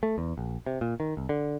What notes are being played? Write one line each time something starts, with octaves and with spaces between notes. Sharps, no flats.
A3
E2
A#1
C3
A#2
D#3
C2
D3